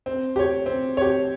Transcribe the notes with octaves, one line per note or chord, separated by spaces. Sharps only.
C4
G4 C#5
C4
G4 C#5